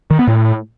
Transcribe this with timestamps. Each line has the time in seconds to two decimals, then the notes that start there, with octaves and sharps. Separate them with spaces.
0.11 D#3
0.19 B3
0.27 A2